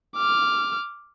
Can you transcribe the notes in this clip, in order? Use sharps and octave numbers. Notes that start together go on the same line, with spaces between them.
D6 F6